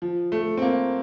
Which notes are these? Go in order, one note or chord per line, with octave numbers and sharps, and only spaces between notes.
F3
A3
C4
A#3